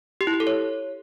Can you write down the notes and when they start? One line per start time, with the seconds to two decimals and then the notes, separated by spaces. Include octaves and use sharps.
0.21 G4
0.27 E4
0.34 G4
0.40 A4
0.47 C#5